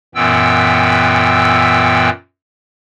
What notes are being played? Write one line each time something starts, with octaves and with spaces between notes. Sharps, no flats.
F#2 A#2 E3 B3 G5 E6